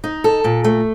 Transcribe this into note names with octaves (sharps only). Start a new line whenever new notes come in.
D#4
A4
A#2
A3